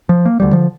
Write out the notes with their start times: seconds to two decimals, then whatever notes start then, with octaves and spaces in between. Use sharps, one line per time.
0.09 F3
0.25 A#3
0.40 D2 D3 G3
0.53 F3